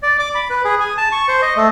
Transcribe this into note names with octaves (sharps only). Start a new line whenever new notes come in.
D5
D6
B5
B4
G#4
G#5
A5
C#6
C5
D#5
A3